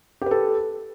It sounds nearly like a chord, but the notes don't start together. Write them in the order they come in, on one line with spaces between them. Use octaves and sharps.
G4 B4 A4